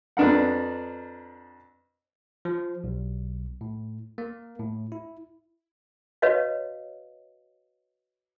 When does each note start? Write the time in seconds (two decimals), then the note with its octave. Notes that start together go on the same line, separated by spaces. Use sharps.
0.17 F2 B3 D4 A#4 F#5
2.45 F3
2.84 B1
3.61 A2
4.18 A#3
4.59 A2
4.92 E4
6.22 F#4 B4 C#5 D#5 F5